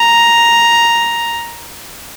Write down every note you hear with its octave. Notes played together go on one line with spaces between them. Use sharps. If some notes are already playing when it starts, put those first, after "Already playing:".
Already playing: A#5